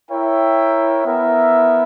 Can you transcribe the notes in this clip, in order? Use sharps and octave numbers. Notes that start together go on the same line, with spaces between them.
E4 A#4 C#5 E5 G5
B3 E4 A#4 E5